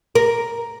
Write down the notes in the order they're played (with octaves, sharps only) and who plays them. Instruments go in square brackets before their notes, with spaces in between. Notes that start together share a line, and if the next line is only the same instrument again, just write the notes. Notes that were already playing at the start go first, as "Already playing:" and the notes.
[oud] A#4